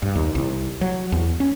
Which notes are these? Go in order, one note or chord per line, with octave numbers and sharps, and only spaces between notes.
G2
D#2
C2
F#3
E2
C#4